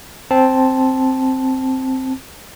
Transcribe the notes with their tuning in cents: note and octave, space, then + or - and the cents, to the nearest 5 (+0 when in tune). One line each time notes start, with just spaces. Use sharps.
C4 +5 A5 -10